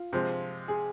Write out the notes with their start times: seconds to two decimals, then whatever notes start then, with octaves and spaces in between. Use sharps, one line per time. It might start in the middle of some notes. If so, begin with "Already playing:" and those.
Already playing: F4
0.13 C3 F3 G#3
0.68 G#4